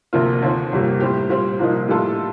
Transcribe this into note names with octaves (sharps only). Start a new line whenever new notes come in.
D2 C3 F3 A#3 F4
D#2 D3 F3 C4
G1 F2 C3 G3 A#3
A2 G3 C4 G4
A#2 G3 C4 F4
C2 A#2 F3 A#3 D#4
A2 G3 D4 F4 A4